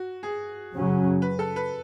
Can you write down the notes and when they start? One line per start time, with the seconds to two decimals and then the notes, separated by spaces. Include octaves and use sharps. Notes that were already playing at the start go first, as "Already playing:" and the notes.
Already playing: F#4
0.23 G#4
0.72 F#2 C#3 F#3 C#4
1.22 B4
1.39 A4
1.56 B4